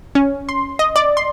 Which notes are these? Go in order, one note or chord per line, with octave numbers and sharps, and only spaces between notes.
C#4
C6
D#5
D5
C6